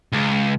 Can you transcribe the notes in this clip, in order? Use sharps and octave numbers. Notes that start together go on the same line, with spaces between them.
C#2